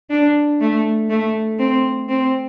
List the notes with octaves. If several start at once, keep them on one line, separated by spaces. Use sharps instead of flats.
D4
A3
A3
C4
C4